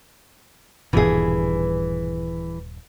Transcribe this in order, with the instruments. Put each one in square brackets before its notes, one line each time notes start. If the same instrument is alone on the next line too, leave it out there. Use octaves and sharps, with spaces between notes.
[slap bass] D#1 G2 B2 [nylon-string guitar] E3 G#4